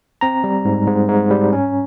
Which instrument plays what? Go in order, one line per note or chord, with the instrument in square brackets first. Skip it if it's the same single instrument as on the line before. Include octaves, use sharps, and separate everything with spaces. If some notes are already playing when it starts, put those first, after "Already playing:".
[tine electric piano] C4 A#5
G3
G#2
G#2
G#2
G3
C#4